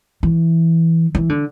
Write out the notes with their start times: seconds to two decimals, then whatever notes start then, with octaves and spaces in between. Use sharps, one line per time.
0.23 E3
1.15 E3
1.29 D3